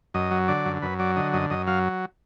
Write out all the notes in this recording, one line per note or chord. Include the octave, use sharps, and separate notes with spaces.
F#2 D#5
F#3
D3 D5
F#2
F#2 B4
F#3 D5
D3 D#5
F#2 D#5
F#2 D#5
F#3 F5